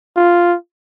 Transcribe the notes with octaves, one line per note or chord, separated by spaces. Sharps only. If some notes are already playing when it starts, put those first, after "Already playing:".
F4